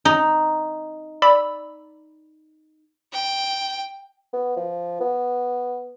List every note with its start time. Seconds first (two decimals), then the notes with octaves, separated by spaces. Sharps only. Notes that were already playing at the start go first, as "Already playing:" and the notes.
0.05 D#4
1.22 D5 B5 E6
3.12 G5
4.33 B3
4.57 F3
5.00 B3